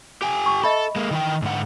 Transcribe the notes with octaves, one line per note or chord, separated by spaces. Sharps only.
G4 G5 G#5
C#6
A4 D#5 E5 B5
G#3 A#3
D#3 E3 G5
G#2 D3 F#5